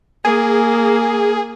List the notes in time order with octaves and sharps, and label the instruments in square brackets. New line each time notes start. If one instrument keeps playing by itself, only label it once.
[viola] A#3 [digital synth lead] G#4